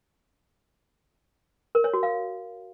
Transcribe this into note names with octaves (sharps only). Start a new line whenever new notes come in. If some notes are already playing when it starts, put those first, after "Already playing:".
A#4
C#5
F#4
F5